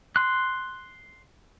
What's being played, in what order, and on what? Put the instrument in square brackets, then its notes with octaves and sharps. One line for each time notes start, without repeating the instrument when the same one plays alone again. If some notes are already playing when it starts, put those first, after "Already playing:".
[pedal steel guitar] C6 F#6